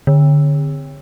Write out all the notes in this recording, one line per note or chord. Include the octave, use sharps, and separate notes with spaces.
D3